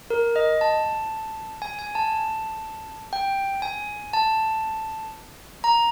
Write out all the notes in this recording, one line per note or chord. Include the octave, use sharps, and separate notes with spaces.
A#4
D#5
A5
G#5
G#5
A5
G5
G#5
A5
A#5